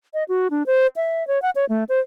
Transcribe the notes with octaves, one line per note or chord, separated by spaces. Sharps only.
D#5
F#4
D4
C5
E5
C#5
F#5
C#5
A3
C5